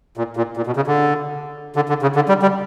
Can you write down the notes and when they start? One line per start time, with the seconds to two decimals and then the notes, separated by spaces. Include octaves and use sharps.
0.17 A#2
0.37 A#2
0.57 A#2
0.67 B2
0.76 C#3
0.87 D3
1.76 D3
1.89 D3
2.02 C#3
2.15 D3
2.29 G3
2.42 G3